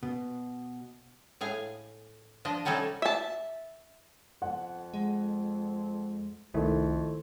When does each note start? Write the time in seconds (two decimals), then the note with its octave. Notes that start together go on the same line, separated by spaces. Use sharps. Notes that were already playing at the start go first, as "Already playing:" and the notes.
0.03 B2
1.41 A2 G#4 F5
2.45 F3 D4 D#5
2.65 C3 G3 C#4 D#4 A4
3.02 E5 A5
4.42 F2 F#5
4.94 G#3
6.54 C2 F2 D#3 A3 E4